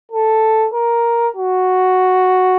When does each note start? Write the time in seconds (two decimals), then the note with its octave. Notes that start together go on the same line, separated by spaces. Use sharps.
0.12 A4
0.73 A#4
1.36 F#4